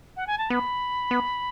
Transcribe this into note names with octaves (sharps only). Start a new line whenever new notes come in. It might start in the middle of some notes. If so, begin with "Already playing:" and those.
F#5
G#5
A5
B3 B5
B3